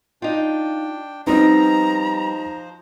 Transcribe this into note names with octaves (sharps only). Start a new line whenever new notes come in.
D4 D#4 F4 G5
F3 G3 B3 C4 D#4 C5 D#5 A#5